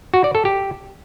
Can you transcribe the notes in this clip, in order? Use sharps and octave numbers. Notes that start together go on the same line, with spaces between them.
F#4
D5
A4
G4